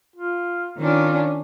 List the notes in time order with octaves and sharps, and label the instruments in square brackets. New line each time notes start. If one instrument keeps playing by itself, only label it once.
[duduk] F4
[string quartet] D#3 C#4 D4 [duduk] F4